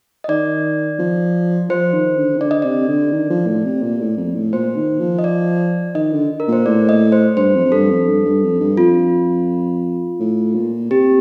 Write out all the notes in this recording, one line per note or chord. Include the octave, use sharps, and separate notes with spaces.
D#5
D#3 D5
F3
F3 C5
D#3
D3
D#3
D3 D5
D#5
C3 D5
D3
D#3
F3
A2
C3
A#2
A2
F2
A2
A#2 C5
D#3
F3
D#5
D5
D#3 D#5
D3
A#4
A#2 C5
A2 D5
D#5
C5
G2 C5
F2
F2
G2 A4
F2
G2
G2
F2
G2
F2 F4
A2
A#2
C3 G4